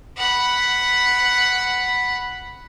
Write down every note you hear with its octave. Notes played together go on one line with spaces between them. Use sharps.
F#5 B5